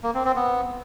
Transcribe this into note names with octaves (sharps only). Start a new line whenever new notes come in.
A#3
C4
C4
B3